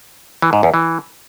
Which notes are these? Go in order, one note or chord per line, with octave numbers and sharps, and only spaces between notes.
E3
G#2
E2
E3